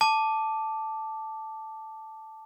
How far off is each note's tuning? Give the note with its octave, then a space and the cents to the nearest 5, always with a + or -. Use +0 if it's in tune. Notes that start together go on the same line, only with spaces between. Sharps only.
A5 +0 D6 +0